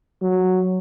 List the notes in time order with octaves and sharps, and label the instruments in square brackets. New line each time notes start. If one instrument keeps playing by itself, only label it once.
[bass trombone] F#3